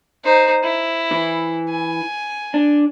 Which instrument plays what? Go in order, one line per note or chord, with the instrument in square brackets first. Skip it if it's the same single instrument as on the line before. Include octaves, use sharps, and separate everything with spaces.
[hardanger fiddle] D#4 C5
E4
[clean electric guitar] E3
[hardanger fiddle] G#5
[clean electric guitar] D4